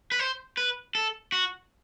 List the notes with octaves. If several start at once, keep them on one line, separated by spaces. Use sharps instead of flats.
B4
C5
B4
A4
F#4